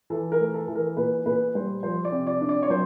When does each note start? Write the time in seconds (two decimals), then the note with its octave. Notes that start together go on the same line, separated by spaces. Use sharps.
0.10 E3 A4
0.32 A#4
0.39 A3
0.54 A4
0.67 E3
0.75 A#4
0.97 A#2 B4
1.26 A#2 B4
1.55 G3 C5
1.83 F3 C5
2.05 D5
2.12 C3
2.27 D5
2.41 D4
2.49 D5
2.62 C#5
2.70 F#3 C5